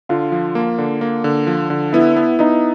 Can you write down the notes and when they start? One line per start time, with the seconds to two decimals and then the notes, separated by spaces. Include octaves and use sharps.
0.09 D3 F4
0.32 F3
0.55 A#3
0.78 D3
1.01 A#3
1.24 D3
1.47 F3
1.70 D3
1.93 B3 E4
2.16 B3
2.39 B3 D#4